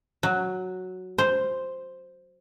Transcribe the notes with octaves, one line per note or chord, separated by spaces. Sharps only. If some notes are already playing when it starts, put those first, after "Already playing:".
F#3
C5